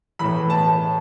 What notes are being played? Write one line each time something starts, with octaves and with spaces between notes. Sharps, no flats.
A2 E3 B5
A5